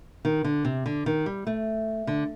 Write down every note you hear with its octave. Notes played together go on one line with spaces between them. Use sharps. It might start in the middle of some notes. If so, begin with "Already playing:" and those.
D#3
D3
C3
D3
D#3
G3
A3
D3